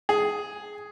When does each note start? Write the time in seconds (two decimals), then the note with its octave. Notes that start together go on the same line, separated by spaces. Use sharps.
0.09 G#4